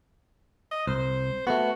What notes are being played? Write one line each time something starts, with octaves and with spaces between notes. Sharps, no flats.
D#5
C2 C5
A3 B3 F#4